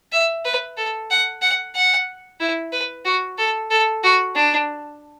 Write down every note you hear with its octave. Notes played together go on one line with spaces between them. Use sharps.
E5
B4
A4
F#5
F#5
F#5
E4
B4
F#4
A4
A4
F#4
D4